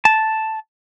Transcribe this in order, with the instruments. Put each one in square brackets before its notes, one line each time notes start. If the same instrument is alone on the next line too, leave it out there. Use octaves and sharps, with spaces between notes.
[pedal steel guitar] A5